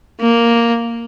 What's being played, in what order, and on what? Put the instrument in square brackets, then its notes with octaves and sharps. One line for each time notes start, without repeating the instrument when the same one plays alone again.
[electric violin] A#3